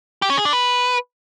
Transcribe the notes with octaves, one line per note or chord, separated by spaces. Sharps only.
G4
C#4
G#4
D4
B4